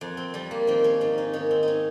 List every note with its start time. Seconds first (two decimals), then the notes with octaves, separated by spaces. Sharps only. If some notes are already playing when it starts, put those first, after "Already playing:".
0.01 F2
0.17 C4
0.34 F2 G3
0.51 A#3
0.67 D#3 C4
0.84 C#4
1.01 G#2 C#4
1.18 D#4
1.33 D#3 C#4
1.51 C4
1.63 C#4 D#4